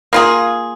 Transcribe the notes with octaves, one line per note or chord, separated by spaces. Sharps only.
A#3 F4 G#4